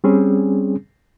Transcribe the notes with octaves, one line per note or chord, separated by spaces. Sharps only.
G3 C4 C#4 G#4